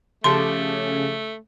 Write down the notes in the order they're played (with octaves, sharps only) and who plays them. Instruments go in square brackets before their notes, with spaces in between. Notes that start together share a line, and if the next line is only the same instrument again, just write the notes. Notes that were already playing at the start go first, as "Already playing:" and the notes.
[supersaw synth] C#3 [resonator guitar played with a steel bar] F3 G4 A4 [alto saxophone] A3 [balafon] C6